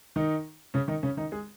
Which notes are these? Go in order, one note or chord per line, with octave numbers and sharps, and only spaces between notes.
D#3 D#4
C#3 C#4
D#3 D#4
C#3 C#4
D#3 D#4
G#3 G#4